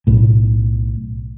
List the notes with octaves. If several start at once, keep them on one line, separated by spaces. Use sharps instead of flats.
B1 A2